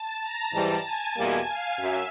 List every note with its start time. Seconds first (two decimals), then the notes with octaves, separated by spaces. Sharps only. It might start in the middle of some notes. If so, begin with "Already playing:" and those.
Already playing: A5
0.22 A#5
0.53 G#2 E3 G3 A5
0.85 G#5
1.16 E2 B2 G3 A#3
1.48 F5
1.78 F#2 E5